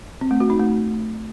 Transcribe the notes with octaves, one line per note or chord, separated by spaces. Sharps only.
C4
A3
F#4
D#4
A3